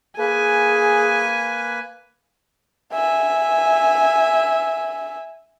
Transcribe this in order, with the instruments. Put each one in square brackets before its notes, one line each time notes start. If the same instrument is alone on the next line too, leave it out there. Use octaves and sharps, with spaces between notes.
[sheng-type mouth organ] A#3 B4 [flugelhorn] G#4 [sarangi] G#5
[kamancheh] E5 G#5